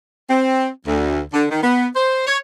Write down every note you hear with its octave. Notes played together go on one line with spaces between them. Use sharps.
C4
D2
D3
D#3
B3
C5
C#5